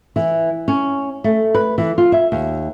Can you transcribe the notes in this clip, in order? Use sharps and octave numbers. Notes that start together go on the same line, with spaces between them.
E3
C#4
A3
B4
E3
F4
E5
D#2